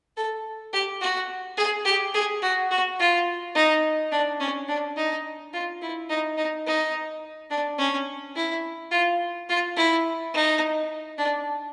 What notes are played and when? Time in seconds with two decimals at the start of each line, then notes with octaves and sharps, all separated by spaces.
0.17 A4
0.73 G4
1.01 F#4
1.58 G#4
1.85 G4
2.14 G#4
2.42 F#4
2.71 F#4
2.99 F4
3.55 D#4
4.12 D4
4.40 C#4
4.69 D4
4.97 D#4
5.53 F4
5.82 E4
6.10 D#4
6.37 D#4
6.67 D#4
7.50 D4
7.79 C#4
8.36 E4
8.92 F4
9.49 F4
9.77 E4
10.34 D#4
11.18 D4